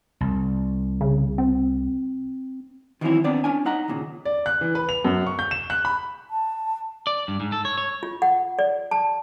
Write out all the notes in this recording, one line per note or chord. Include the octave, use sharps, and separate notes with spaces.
C2
C#3
C4
D#3 E3 F#3 C4 C#4 E4
D#2 B3 C4 D4 D5
C#4 D4 G#5
D#4 F#5 A#5
D#2 A#2 C#3
D5
F#6
E3
B4
F7
F#2
C#6
G6
E7
F#6
B5
A5
D5
G2
G#2
A4
C#5
C#5
F4
F#5
D5
A5